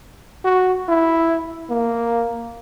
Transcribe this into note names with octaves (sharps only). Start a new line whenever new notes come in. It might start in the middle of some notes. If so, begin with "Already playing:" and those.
F#4
E4
A#3